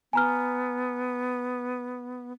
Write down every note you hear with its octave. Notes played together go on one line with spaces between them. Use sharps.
B3 G#5 A#5 F6